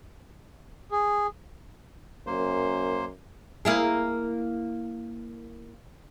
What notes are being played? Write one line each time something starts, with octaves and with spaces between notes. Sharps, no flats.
G#4
F#2 A#3 C5
A#3 E4 G#4